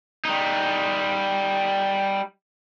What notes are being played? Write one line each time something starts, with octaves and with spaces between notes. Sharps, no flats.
G3 D#4